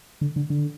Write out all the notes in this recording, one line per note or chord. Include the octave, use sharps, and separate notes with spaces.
D3
D3
D3